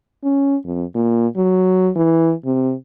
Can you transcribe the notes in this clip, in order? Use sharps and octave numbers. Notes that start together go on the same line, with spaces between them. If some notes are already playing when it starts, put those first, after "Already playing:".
C#4
F2
A#2
F#3
E3
C3